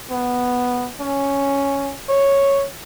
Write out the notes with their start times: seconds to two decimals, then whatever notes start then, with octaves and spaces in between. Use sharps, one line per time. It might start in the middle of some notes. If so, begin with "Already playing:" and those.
0.11 B3
1.01 C#4
2.10 C#5